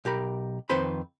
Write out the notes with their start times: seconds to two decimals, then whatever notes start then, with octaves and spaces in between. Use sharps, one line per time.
0.05 B1 G4 A#4 B5
0.69 F2 D#3 C4 B4 C5 B5